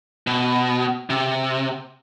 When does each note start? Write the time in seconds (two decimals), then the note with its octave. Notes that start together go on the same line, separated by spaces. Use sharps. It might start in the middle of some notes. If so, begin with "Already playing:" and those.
0.27 B2
1.10 C3